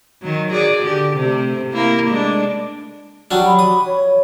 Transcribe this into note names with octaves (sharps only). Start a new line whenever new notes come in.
D#3 F#3
F#4 G#4 D5
D3 G4
C3 A3
A#3 E4
G#3 A3 D4
F#3 G3 D4
B5
D#6
C#5